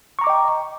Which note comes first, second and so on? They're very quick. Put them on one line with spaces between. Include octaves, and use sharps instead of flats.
C#6 A#5 D6 D#5 G5